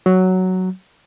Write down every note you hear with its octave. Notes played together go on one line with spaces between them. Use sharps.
F#3